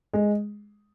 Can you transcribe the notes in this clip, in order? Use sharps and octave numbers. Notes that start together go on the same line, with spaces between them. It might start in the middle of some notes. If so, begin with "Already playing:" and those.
G#3